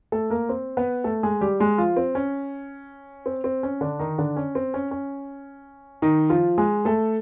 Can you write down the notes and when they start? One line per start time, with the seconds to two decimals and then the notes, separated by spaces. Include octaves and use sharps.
0.12 A3 A4
0.30 A#3 A#4
0.49 C4 C5
0.77 B3 B4
1.04 A3 A4
1.23 G#3 G#4
1.41 G3 G4
1.60 G#3 G#4
1.78 F3 F4
1.97 C4
2.15 C#4
3.26 C4
3.44 C4
3.63 C#4
3.81 D3 D4
3.99 D#3 D#4
4.18 D3 D4
4.36 C#4
4.55 C4
4.74 C#4
4.91 C#4
6.02 D#3 D#4
6.30 F3 F4
6.58 G#3 G#4
6.85 A3 A4